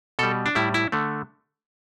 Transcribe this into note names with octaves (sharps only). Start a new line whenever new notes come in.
B2 G3 A4
D4
A2 G3 E4
E4
D3 A3